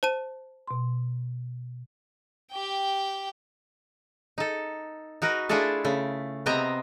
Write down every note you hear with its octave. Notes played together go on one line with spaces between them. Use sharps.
C5 A5 D#7
B2 C6
G4 G5
D#4 A4
D#4 F#4 A#4 B4
A3 D4 E4 F4 G#4 A4
C#3 A3
C3 B3 C4 D#5 E5 A#5